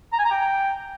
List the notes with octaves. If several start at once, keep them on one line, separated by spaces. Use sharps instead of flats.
A#5
G#5
A#5
G5